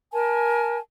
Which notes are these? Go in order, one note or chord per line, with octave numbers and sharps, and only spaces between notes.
A#4 G#5 A5